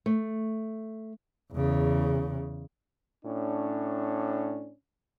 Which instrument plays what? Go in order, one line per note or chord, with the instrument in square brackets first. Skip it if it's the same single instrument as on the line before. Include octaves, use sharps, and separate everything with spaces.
[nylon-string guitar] A3
[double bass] E2 C#3
[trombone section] A2 C#4 D4